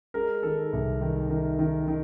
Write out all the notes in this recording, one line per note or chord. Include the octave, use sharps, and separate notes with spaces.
G#3 A#4
D#3 A4
C2
D#3
D#3
D#3
D#3